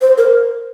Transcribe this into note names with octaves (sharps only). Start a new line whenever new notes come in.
C5
A#4